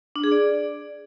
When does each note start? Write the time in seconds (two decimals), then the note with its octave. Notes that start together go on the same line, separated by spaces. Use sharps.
0.16 D4
0.24 G#4
0.32 D5